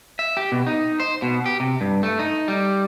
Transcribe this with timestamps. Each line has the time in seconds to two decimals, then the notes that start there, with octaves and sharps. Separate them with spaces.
0.19 E5
0.37 G4
0.52 B2
0.67 D#4
1.00 C5
1.22 B2
1.46 G4
1.60 C3
1.81 G2
2.03 A3
2.19 D#4
2.48 G3